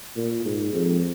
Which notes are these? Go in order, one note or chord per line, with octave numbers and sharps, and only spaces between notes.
A#2
G#2
F2